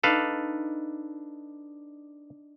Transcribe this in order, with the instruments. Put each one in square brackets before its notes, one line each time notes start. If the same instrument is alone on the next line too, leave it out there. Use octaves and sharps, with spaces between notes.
[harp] D4 D#4 [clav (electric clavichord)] A4 B4 F5